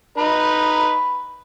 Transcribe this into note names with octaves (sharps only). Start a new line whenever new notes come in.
D#4 B4 D#5 B5